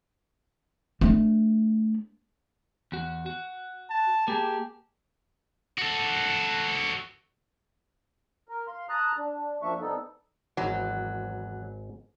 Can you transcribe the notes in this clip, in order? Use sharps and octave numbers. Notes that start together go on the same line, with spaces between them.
A3 D4
E2 F#4
F#4
A5
A#3 G4 G#4 A5
F#4 A4
A#4
F5 C6
A5 A#5 D#6 F#6
D4
F#2 F3 A#3 D4 E5 C#6
C3 G3 B3 D#4 A4
G#1 E2 G#2 F#3